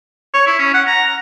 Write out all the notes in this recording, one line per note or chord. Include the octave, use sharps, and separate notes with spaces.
C#5
E4
C#4
F#5
A#5
A#5